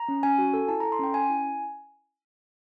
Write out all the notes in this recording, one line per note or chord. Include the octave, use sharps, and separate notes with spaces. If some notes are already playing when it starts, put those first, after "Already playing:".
Already playing: A#5
C#4
C#4 G#5
F#4
A4
E4 A5
A4 A#5
C6
C#4 G5
C#4 G#5
E4